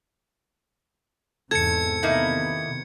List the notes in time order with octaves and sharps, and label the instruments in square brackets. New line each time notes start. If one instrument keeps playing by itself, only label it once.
[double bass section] E2 G#2 C3 [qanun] A4 [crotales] G#6 C#7
[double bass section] C3 D#3 B3 [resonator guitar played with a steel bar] A#3 D#4 E4